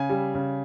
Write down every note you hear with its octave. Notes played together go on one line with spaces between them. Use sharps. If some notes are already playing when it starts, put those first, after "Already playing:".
Already playing: C#3 G#5
G3
C#3